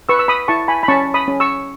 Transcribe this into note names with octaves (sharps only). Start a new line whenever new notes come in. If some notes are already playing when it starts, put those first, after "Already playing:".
B4 C#6 E6
E6
B5 D#6
E4 A5 C#6
G#5 B5
B5
C#4 A5 C#6
B5 D#6
C#4
C#6 E6